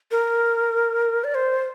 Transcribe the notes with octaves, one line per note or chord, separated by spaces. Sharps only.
A#4
D5
C5